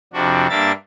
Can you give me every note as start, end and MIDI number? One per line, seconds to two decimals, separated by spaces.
0.13 0.47 41
0.13 0.47 48
0.13 0.47 62
0.13 0.47 66
0.50 0.72 43
0.50 0.72 58
0.50 0.72 62
0.50 0.72 70
0.50 0.72 76
0.50 0.72 93